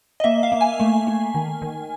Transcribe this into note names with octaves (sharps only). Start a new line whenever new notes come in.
D#5
A#3 E5
F5
A#3
G#5
A3
A3
D#3
D#3